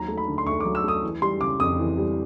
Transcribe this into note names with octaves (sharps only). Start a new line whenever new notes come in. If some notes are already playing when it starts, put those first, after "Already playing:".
Already playing: D#2 F#3 A#5
A3
B5
D3
C6
D2 C#6
F#3 D6
E6
A3 D#6
E3
G3 C6
C#3 D6
F2 D#6
E3
G3